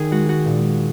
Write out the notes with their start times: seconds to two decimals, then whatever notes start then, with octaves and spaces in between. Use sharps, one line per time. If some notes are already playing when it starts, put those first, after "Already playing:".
Already playing: D#3 G#4
0.11 G#3 F#4
0.29 F#4
0.46 A#2